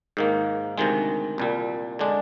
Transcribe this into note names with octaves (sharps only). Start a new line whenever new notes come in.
G#2 D#3 A#3
D2 C3 D#3 G#3
C2 A#2 G3
D3 G#3 D4